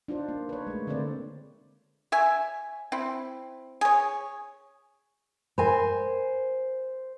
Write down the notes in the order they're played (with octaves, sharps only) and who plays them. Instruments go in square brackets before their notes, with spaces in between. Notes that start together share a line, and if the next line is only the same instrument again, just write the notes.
[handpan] D4 D#4 F4 C5
A#3
B4 C#5
G#3 A3
D3 A#3 C4 A4 C5 D5
[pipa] C#5 E5 G#5
C4 E4
G#4 C#5
[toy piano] A#4 E5 B5 [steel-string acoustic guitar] C5 G#5